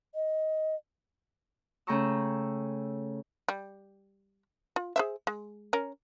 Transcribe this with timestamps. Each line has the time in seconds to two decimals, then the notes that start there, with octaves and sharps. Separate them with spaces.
0.15 D#5
1.87 C#3 A3 G5 A#5 C#6 E6
3.49 G3
4.76 F4
4.96 G#4 C5 E5
5.27 G#3
5.73 C#4 A#4